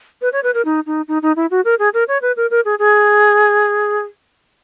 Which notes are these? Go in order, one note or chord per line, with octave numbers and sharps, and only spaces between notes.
B4
C#5
B4
A#4
D#4
D#4
D#4
D#4
E4
F#4
A#4
G#4
A#4
C#5
B4
A#4
A#4
G#4
G#4